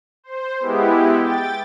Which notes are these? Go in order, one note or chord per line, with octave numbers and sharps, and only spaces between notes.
C5
G#3 B3 E4 G4
G5 A6